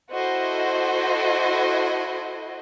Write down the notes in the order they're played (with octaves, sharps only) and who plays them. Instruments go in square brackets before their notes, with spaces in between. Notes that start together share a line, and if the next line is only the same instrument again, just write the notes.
[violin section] E4 F#4 A4 C5 D#5